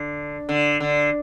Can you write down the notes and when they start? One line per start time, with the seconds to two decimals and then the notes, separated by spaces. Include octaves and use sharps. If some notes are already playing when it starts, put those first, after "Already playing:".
Already playing: D3
0.49 D3
0.80 D3